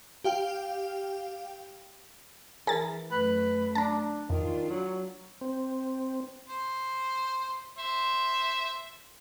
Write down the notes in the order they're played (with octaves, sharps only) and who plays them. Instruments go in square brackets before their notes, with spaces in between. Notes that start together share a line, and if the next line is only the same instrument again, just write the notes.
[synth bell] G4 F5 G5
[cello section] E3 [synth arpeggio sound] G#4 A#4 A6
[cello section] F#2 A3 [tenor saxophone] B4
[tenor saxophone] D4 [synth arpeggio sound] A5 A#5
[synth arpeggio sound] F2 [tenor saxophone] D#3 [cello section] D4 F4
[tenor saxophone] F#3
[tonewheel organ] C4
[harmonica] C5
C5 E5